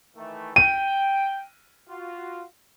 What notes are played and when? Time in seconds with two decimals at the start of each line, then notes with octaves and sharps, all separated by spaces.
0.16 D#3 E3 A3
0.56 G5 D#7
1.89 F4 F#4